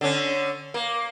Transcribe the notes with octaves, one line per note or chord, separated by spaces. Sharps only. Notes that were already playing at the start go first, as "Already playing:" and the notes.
D3 C#4
A#3